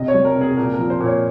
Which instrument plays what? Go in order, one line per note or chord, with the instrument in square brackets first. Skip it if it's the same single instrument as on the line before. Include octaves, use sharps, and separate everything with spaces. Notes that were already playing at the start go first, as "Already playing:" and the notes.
Already playing: [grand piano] C3 D#5
C#5
G3
A#4
C3
G#4
A#2 A#4
A#4
F3
C5
A#2
C#5